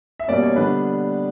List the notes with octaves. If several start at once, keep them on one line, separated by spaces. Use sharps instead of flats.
E5
B2 G3 A#3 C#4 D5
C#5
D3 G3 B3 D4 B4